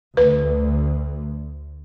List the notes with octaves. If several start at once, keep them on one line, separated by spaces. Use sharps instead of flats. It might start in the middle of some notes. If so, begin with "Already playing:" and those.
D2 B4